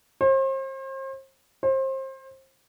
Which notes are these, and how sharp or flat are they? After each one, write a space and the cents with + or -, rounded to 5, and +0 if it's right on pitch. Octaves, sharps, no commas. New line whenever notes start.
C5 +40
C5 +30